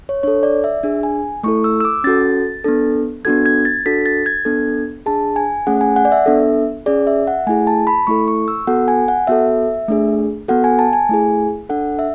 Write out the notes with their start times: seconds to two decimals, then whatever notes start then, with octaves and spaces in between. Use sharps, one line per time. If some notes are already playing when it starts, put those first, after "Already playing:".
0.09 C#5
0.23 D4 A4 C#5
0.43 D5
0.64 E5
0.83 D4 G#4
1.03 G#5
1.43 A3 E4 A4 C#6
1.64 E6
1.81 E6
1.85 D6
2.04 C#4 F#4 A4 A6
2.64 B3 D4 A4
3.25 B3 D4 F#4 A4 G#6
3.46 G#6
3.65 A6
3.86 D4 F#4 A4 B6
4.06 A6
4.26 G#6
4.45 B3 D4 A4
5.06 D4 G#4 A5
5.36 G#5
5.67 A3 C#4 G#4 F#5
5.81 G#5
5.96 F#5
6.05 D5
6.12 E5
6.26 B3 D4 A4
6.86 C#4 G#4 D5
7.07 E5
7.27 F#5
7.46 A3 E4 G#4 G#5
7.67 A5
7.87 B5
8.07 A3 E4 A4 C#6
8.28 C#6
8.48 E6
8.67 B3 F#4 A4 F#5
8.88 G#5
9.08 F#5
9.27 B3 F#4 A4 E5
9.88 A3 D4 G#4
10.48 B3 F#4 A4 F#5
10.64 G#5
10.79 A5
10.93 G#5
11.09 A3 E4 G#4
11.69 D4 A4 F#5
11.99 E5